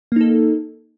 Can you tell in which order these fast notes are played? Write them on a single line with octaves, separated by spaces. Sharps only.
A#3 D#4 A4